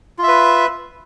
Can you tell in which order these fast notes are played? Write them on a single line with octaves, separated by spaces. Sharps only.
F4 E5 B4